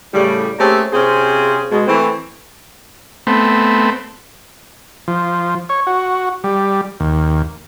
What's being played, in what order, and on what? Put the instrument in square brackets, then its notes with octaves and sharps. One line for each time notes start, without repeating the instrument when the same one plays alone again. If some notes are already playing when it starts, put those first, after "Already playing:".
[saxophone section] A2 C#3 G3
A3 A#3 C4 C#4 G4 G#4
C3 C4 C#4 F4 G#4
B2 G#3
E3 A3 C4
[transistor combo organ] A3 B3 C4
F3
C#5
F#4
G3
D#2